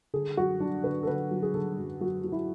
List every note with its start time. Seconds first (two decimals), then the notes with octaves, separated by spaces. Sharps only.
0.14 D3 G#4
0.37 F#2 F#4
0.60 F#3 D4
0.84 D3 B4
1.03 A4
1.07 D3 B4
1.31 F#3
1.43 G#4
1.54 D3 A4
1.77 F#2
2.01 F#3 F#4
2.24 F#3
2.32 E4